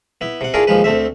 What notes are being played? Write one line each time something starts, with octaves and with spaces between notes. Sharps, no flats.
B3 E4
C3 F#5
D4 E4 F4 G#4 A#4 F5
D#2 F3 G#3 B4
D2 A3 C4 E5